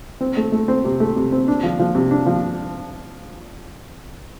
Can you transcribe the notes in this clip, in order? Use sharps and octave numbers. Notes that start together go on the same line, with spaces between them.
C4
A3
A3
C4
C3
A3
C3
C4
D4
F3
F3
C3
D4
F3